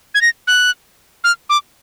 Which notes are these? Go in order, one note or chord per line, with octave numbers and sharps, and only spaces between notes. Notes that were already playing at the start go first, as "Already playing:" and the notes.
G#6
A#6
F#6
F6
D6